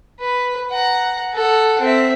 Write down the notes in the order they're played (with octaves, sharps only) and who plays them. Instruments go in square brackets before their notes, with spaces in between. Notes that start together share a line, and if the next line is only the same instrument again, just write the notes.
[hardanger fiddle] B4
F#5 A#5
A4 F#5
C4 E5